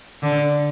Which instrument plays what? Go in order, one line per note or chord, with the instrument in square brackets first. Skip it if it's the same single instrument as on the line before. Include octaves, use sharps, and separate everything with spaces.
[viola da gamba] D3